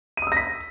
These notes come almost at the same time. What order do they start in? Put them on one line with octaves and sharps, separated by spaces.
D#7 D#6 E6 A#6 B6